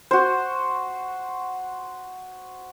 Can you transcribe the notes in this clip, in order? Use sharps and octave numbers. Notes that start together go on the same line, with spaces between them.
F#4 C5